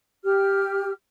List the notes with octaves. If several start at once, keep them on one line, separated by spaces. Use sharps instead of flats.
G4 F6